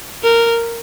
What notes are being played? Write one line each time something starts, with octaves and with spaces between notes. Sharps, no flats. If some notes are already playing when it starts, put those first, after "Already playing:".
A#4